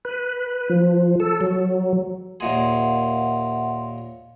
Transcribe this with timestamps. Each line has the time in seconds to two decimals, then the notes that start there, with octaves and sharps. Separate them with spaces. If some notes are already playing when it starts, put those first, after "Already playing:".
0.05 B4
0.69 F3
1.20 A4
1.41 F#3
2.40 D#2 A#2 G#4 E5 F#5 C6